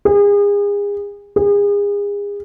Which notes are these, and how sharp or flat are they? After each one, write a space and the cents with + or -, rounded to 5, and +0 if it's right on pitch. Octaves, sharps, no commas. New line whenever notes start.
G#4 -35
G#4 -35